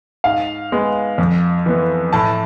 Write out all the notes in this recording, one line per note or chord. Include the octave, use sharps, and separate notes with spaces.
G#2 F5
G#3 B3
F2
E3 B3
A2 A5